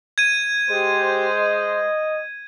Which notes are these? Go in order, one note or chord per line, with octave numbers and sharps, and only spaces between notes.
G#6 D#7
G#3 G4 C5
D#5